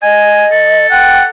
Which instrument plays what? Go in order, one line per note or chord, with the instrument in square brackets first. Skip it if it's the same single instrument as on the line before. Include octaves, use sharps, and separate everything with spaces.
[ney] D#5 [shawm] G#5
[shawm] A4
[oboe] F#5 [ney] G5